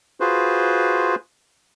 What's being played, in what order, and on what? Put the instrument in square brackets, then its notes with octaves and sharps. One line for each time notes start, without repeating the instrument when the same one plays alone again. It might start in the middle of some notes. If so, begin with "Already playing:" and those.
[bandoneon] F4 F#4 G#4 B4 C5